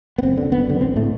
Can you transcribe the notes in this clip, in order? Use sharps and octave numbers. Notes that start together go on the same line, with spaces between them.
B3
F#1 C4
F#2 D3
F#1 B3
F#2 D3
A1 C4
A2 A3